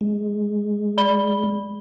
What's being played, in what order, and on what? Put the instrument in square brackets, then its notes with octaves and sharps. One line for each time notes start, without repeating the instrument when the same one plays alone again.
[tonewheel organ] G#3
[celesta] D5 B5 G7